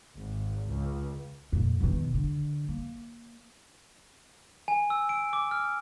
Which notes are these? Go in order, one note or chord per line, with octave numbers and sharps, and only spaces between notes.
G#1
C#2
F2 A#2
B2 D#3
D3
A#3
G#5
E6
D7
D6
F6